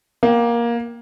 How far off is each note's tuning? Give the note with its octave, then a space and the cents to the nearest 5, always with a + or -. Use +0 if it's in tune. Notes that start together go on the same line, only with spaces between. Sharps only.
A#3 +15 G5 -10